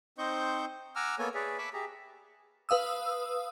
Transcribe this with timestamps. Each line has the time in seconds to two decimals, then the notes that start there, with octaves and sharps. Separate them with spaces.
0.18 C4 D#4 C5 D#5 C#6 G6
0.96 F#5 G#5 A#5 D6 E6 F6
1.19 A#3 B3 A4 C#5 G#5
1.34 G#4 B4 C#5 D5 E5
1.58 E5 G#5 A5 B5 C#6 D6
1.73 G4 G#4 E5 A#5
2.69 B4 F5 D#6 E6